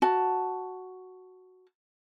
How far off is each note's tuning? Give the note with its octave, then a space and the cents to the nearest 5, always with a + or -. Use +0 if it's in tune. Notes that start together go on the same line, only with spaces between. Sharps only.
F#4 +0 A5 +0